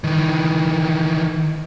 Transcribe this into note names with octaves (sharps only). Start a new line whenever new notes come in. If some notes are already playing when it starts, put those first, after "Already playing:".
D#3 E3